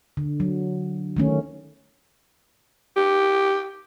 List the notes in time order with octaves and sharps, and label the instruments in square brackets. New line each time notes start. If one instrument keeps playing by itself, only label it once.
[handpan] D3
F#3
D#3 A3 C#4
[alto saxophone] G4